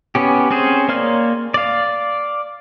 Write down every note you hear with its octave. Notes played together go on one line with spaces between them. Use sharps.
B3 C#4 G4
C4 C#4 G#4 C5
A#3 C#5 D5 C6 F6
D5 F5